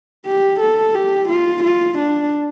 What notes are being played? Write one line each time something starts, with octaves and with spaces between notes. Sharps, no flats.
G4
A4
G4
F4
F4
D4